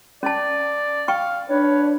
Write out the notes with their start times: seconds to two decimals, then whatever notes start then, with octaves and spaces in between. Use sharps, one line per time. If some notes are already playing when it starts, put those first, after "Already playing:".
0.23 C#4 D5 A5
1.08 F5 G5 C#6
1.49 D4 B4 C#5